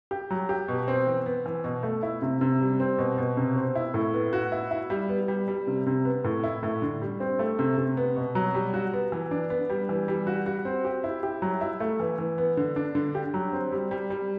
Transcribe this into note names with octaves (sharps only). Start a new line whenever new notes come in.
G4
F#3
G4
B2
C4
E3
B3
E3
B2
A3
E4
C3
C3
G3
C4
B2
B2
C3
C4
E4
A2
B3
F#4
E4
E4
G3
B3
G3
G3
C3
C3
B3
A2
E4
A2
D3
G3
C4
A3
C3
C3
B3
B2
F#3
G3
F#4
B3
E3
D4
B3
G3
E3
G3
F#4
F#4
C4
G4
E4
G4
F#3
E4
A3
E3
E3
B3
D3
D4
D3
G4
F#3
C4
G3
G3
G3